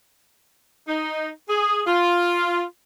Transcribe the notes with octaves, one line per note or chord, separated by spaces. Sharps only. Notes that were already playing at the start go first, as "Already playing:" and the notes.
D#4
G#4
F4